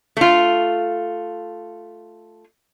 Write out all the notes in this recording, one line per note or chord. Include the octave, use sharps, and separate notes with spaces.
A3 F4